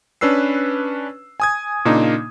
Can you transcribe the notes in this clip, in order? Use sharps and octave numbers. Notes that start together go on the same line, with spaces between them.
C#4 D4 B4 E6 C7
G#5 D#6 G#6
A#2 C#3 A#3 D4 D#4